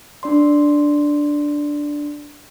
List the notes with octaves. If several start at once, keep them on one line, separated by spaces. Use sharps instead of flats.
D4 D5 C6